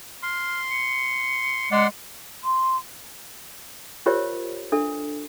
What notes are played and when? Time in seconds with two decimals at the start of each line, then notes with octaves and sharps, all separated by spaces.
0.23 C6 F6
0.71 C#7
1.72 G#3 D5 F#5 C6
2.44 C6
4.06 F4 G4 A#4 C5 C#5 E5
4.72 D4 A4 E5